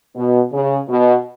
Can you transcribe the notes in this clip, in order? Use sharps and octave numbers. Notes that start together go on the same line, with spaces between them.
B2
C#3
B2